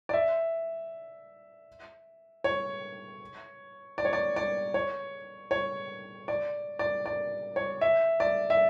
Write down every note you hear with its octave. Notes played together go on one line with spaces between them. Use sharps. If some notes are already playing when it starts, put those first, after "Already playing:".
D5
E5
C#5
D5
C#5
D5
D5
C#5
C#5
D5
D5
D5
C#5
E5
D5
E5